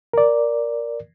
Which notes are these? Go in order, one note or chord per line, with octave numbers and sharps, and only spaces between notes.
A#4 D5